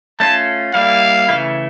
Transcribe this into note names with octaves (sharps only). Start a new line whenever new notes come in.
A3 C#4 F4 A5
G3 A#3 E4 F5
C#3 E3 A3 E4